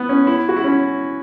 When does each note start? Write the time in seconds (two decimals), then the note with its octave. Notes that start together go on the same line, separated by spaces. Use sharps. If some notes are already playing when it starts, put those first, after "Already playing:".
Already playing: B3
0.09 C#4
0.27 E4
0.49 F#4
0.56 E4
0.64 C#4